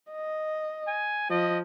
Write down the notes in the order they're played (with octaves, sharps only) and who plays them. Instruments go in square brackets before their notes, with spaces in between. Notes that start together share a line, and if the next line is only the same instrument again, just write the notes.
[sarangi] D#5
[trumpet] G#5
[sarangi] F3 [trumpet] D#5